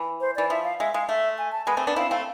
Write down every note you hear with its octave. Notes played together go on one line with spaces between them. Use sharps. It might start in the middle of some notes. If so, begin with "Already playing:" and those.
Already playing: E3
C5
E3 D5
F3 E5
F5
G#3 E5
G#3 F5
A3 E5
G#5
A5
G#3 B3 G#5
A3 C4
B3 D4
C4 E4 F5
A3 C4 F5